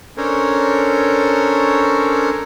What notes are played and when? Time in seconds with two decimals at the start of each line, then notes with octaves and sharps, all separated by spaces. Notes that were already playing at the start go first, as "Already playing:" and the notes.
0.17 C#4 D4 A4 A#4 C5 C#5